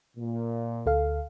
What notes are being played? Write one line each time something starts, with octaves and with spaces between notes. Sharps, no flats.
A#2
D2 A4 F5